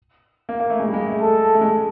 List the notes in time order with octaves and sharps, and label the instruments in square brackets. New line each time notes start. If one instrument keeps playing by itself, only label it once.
[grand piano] A#3
A#3
A3
G#3
G3
G#3
A3
[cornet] A4
[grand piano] A3
G#3